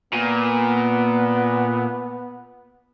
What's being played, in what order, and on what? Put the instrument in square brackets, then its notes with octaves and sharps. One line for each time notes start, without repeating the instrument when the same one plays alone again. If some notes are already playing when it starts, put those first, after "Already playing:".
[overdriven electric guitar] A#2 [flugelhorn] B3